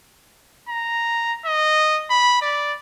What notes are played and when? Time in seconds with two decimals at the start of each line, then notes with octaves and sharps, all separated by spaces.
0.69 A#5
1.45 D#5
2.10 B5
2.42 D5